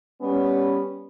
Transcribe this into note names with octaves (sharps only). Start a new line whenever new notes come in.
G3 B3 C#4